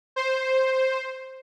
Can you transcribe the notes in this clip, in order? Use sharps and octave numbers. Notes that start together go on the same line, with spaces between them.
C5